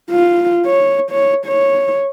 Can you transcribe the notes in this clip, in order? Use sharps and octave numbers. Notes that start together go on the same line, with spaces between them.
F4
C#5
C#5
C#5